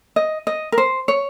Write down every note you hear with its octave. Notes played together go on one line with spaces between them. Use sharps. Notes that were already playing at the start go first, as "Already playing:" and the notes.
D#5
D#5
A#4
C5
C#5